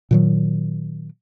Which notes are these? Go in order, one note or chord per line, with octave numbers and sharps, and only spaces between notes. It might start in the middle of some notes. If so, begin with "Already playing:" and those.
A#2 D#3 F#3